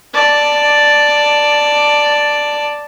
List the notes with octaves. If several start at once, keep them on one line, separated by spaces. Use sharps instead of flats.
D5 A5